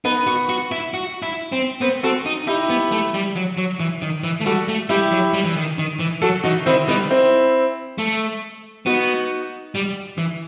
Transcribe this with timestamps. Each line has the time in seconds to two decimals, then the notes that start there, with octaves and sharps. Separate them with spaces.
0.05 B3 D#4
0.27 F#4
0.49 F#4
0.72 E4
0.94 F#4
1.23 E4
1.52 C4
1.81 B3 C4
2.03 C4 F#4 A4
2.26 D#4
2.47 D#4 E4 G4
2.70 B3
2.92 A3
3.14 G3
3.36 F#3
3.58 F#3
3.80 E3
4.02 D#3
4.24 E3
4.41 A3
4.46 G3 F#4 A4
4.68 A3
4.89 G3 E4 G4
5.12 F#3
5.34 G3
5.45 E3
5.56 D#3
5.78 D#3
5.99 E3
6.22 F#3 F#4 A4
6.43 E3 D#4 F#4
6.66 D#3 C4 E4
6.88 G3 B3 D#4
7.10 C4 E4
7.98 A3
8.86 B3 D#4 F#4
9.75 G3
10.18 E3